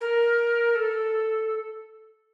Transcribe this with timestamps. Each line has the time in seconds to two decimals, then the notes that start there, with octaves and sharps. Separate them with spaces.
0.01 A#4
0.75 A4